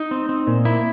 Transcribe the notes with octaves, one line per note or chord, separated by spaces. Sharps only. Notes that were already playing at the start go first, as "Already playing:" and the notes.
Already playing: D#4
C4
C4
A#2
A#3 E4